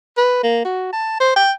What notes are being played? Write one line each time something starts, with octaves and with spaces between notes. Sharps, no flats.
B4
A#3
F#4
A5
C5
G5